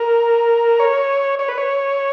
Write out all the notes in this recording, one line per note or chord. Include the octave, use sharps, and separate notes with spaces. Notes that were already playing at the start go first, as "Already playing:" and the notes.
Already playing: A#4
C#5
C#5
B4
C#5